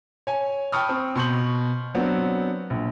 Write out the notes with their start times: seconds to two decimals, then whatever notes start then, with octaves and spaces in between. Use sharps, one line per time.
0.27 C#5 G#5
0.72 G5 A5 B5 C#6 D#6 F6
0.89 C4
1.15 B2 C6 C#6 G6 F#7
1.95 F#3 B3 C4 D4 F#4
2.70 A#1